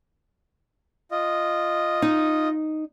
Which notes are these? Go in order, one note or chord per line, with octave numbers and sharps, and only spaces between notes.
F4 D#5
D#4